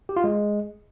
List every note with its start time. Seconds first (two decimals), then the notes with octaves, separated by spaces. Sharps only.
0.09 G4
0.16 F4
0.24 G#3